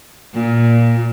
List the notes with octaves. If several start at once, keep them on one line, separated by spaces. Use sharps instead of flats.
A#2